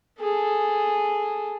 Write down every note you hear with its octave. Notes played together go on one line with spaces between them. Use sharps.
G#4 A4